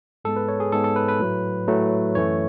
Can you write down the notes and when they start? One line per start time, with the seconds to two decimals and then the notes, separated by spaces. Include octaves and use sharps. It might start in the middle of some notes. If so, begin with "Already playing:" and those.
0.25 G#2 G#3 B3 A4
0.36 B4
0.48 C#5
0.60 G#4
0.72 G#2 G#3 B3 A4
0.84 A4
0.96 B4
1.09 B4
1.20 A2 F#3 A3
1.67 A2 F#3 A3
2.15 F#2 E3 A3 C#5